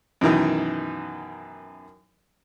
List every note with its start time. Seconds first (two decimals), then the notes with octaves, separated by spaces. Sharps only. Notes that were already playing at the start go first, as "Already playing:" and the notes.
0.21 F#2 B2 D#3 E3